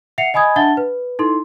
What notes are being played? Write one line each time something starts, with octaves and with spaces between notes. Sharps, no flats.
E5 F#5 C7 C#7 F7
D#5 G#5 B5 D#6 G#6
D4 E5 F#5 A5 A6 G7
B4
D#4 E4 A4 C6